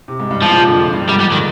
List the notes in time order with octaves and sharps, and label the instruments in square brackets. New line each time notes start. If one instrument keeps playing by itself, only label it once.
[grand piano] C3
G#2
G2
[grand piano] G2 [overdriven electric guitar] F3
[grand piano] A#2
C3
D3
F2
G2
[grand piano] G#2 [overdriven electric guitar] G3
[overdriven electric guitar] G3
D#3